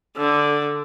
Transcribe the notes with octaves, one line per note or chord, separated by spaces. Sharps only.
D3